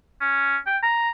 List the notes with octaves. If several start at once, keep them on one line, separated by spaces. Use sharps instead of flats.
C#4
G5
A#5